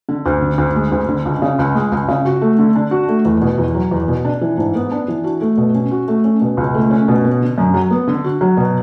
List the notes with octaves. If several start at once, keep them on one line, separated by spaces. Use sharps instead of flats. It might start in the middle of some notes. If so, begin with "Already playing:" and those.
D3
D2
D3
D2
G#3
D2
D3
C#2
C#3
C#2
G#3
C#2
C#3
F#4
A3
D3
D4
F#4
A3
E2
B2
E2
F#3
E2
B2
D4
E3
G#2
B3
D4
E3
F#4
A3
B2
C#4
F#4
A3
C#4
B2
C#2
A3
C#4
B2
B3
D3
F#2
F#3
B3
D3
F#4
F#3
B2